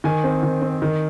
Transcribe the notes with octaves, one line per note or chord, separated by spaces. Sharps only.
D#3 G#5
C4
D#3
C4
D#3